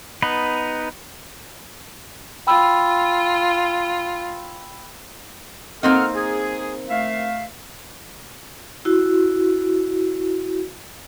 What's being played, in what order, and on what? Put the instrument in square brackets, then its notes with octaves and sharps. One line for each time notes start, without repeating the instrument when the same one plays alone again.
[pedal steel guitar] B3 D#4 B4
[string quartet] F4 [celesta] G5 B5 E6
[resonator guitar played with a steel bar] A#3 C4 D#4 [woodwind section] A4 F#5 F6
[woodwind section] G#4
A3 E5 F5
[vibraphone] E4 F#4